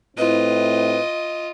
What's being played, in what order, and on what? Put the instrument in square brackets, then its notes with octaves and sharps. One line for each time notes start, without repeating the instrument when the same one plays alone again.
[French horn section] A2 C4 E4 [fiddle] F4 D#5 [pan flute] B4